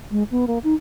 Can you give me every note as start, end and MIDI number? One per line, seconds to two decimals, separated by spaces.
0.11 0.23 56
0.31 0.45 59
0.47 0.58 58
0.64 0.74 63